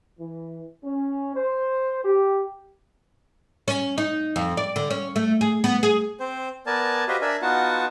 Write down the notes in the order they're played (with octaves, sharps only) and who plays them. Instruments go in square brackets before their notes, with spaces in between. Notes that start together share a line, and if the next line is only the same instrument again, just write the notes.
[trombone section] E3
C#4
C5
G4
[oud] C#4
D#4
F2
D5
D3
C#4
A3
G#4
B3
G#4
[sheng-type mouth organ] C4 C5
B3 A#4 D5 G#5 A5
F#4 G4 B4 C5 D#5 F5
D4 A#4 D5 E5 G#5
B3 D#4 F4 F#4 F#5 A5